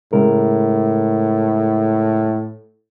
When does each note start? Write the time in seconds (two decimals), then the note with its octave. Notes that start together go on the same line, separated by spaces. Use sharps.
0.13 A2 C#3 G#3 A#4